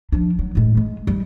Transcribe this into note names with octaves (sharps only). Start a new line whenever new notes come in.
F3 D4
F#3
A2 G#3
G#3
G3